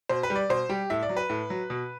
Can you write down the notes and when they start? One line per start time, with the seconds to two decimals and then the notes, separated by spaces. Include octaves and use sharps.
0.09 B2 C5
0.23 B4
0.30 G3
0.36 D5
0.49 B2 C5
0.69 G3 G4
0.90 A2 E5
1.03 D5
1.09 F#3
1.17 B4
1.30 A2
1.50 F#3
1.70 B2